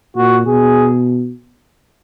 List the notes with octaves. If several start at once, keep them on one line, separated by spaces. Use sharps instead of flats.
A#2 F#4
B2 G#4